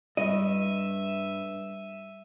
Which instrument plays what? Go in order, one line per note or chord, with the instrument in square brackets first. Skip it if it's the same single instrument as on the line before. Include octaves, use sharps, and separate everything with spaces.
[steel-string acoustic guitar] G2 [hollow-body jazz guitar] D#5 [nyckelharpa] E5 [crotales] D#7